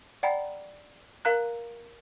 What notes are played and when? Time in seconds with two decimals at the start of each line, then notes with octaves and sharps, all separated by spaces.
0.23 D5 F#5 G5 A#5 B5
1.25 A#4 F5 A#5 F#6